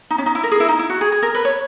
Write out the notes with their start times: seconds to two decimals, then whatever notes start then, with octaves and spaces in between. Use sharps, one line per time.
0.10 D#4
0.18 C#4
0.26 D#4
0.35 E4
0.43 A#4
0.51 G#4
0.60 E4
0.69 D#4
0.79 E4
0.89 F#4
1.01 G#4
1.12 G#4
1.23 A#4
1.35 B4
1.45 C#5